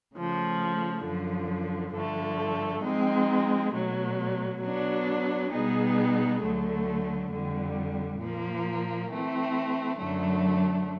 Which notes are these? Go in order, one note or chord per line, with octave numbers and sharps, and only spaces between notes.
C#3 F3 A3
F#2 D3 F3
G2 D3 F3 A3
F3 G#3 C4 D#4
B2 F#3 A3
F#3 B3 D4
B2 G3 B3 D#4 G#4
D2 D3 F#3 A3
F2 D3 G3
A#2 F3 A#3
E3 A3 C4
F#2 D3 F#3 A3 D4